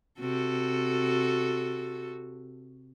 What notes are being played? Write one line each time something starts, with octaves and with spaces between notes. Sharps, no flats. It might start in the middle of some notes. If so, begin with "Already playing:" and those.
C3 F#4 A4